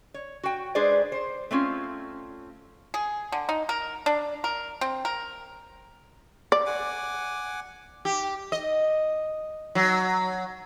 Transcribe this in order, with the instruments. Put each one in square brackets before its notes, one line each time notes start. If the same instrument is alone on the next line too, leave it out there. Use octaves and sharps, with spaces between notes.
[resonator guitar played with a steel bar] C#5
F#4 G5
G#3 D4 G#4 B4 C5 D5
C5
A3 C4 C#4 F4
[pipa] G#4
D3
D#4
A#4
D4
A#4
C4
A#4
[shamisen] D5
[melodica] F#5 G#5 D6
[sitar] G4
D#5
F#3